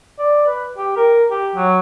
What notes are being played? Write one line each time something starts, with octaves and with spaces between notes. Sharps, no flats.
D5
B4
G4
A#4
G4
F#3